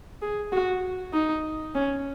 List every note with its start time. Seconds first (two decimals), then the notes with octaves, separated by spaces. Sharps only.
0.22 G#4
0.52 F#4
1.13 D#4
1.75 C#4